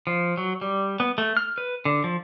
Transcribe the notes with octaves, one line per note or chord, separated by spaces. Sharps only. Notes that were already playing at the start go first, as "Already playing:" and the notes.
F3
F#3
G3
B3
A3
F6
B4
D3
F3